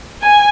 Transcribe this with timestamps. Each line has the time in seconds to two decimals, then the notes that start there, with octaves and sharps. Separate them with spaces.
0.20 G#5